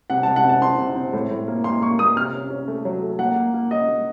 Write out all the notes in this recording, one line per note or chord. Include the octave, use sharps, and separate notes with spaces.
C3 F#5
C3 A5
F#5
C4 A5
C4 C6
C3
C4
A2
A2
A#3
A#3 C6
A#3 C#6
A#3 D#6
C3 F6
C#4
C#4
A3
F#3
A3
A#3 F#5
A#3
A#3
C#4 D#5
A#3